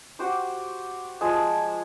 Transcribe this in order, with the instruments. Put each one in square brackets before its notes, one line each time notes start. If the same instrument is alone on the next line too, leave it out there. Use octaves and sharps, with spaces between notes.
[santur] F#4 G4 C5 D6
F3 G#3 G#4 A5